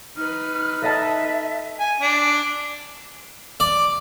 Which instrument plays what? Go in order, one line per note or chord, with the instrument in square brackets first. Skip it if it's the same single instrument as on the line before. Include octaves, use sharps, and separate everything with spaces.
[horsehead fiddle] D#4 B4 [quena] F6
[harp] A4 D#5 A5 [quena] E5
[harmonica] G#5
D4
[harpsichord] D5